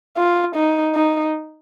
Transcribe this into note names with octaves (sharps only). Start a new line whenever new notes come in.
F4
D#4
D#4